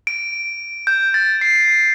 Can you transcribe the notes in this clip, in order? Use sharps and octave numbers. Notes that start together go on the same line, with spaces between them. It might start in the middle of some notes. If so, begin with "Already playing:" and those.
D7
G6
A6
C7
C7